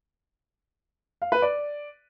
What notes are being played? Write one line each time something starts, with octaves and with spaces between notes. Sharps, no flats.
F5
B4
D5